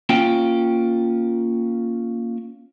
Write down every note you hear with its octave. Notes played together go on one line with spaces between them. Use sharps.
A#3 C#4 F4 G5